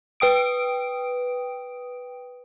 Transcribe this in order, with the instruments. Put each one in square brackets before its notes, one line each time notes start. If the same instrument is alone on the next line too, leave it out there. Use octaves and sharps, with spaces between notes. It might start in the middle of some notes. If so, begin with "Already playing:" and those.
[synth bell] B4 G5 D#6 D7